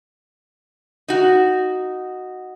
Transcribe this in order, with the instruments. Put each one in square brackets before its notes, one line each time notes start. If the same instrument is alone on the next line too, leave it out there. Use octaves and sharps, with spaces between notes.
[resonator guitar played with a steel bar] D#4 F#4